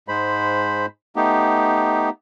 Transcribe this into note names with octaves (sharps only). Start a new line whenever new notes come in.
G#2 G#3 C5 B5
A3 B3 D#4 G4